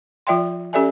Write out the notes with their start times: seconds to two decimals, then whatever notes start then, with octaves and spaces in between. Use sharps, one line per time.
0.27 F3 F4 D5 E5 G5 C6
0.73 C#4 G4 A4 D5 E5 G#5